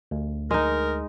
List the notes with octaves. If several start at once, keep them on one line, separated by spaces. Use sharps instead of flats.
D2
G#3 D#4 A#4